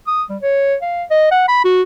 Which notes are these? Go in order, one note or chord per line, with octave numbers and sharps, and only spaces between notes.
D#6
G3
C#5
F5
D#5
F#5
B5
F#4